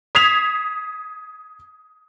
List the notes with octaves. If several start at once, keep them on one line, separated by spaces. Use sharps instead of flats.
D#6 G#6 B6 C7 E7 F7